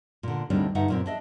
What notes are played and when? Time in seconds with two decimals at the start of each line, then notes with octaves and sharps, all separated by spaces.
0.23 A#2 D3
0.50 D2 A2 D#3 G3 C4 D4
0.75 G2 D3 D#4 E5 F#5
0.88 F#2 A#2 C4
1.06 D4 D#5 E5